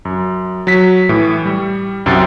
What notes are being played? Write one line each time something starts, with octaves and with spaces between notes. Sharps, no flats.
F#2
F#3 B6
A2 E3
G3
C2 F#2 C3 G5 A6 C7